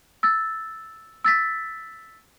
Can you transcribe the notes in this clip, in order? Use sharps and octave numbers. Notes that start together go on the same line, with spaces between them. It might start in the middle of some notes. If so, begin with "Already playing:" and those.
E6 A6
E6 A6 B6